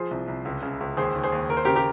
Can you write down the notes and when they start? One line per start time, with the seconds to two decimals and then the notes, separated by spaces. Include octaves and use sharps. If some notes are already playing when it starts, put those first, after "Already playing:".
Already playing: F3 G#4 C5
0.11 C2
0.28 C2
0.45 C#2
0.63 C#3
0.81 C#2
0.97 D#2 G#4 C5
1.15 D#2
1.23 G#4 C5
1.32 D#2
1.49 D#2 A#4
1.57 C5
1.65 C#3 G4 A#4
1.75 G4 A#4